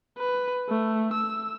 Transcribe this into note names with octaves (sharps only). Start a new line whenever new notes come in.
B4
A3
E6